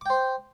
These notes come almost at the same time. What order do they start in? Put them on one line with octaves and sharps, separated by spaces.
D6 G5 C5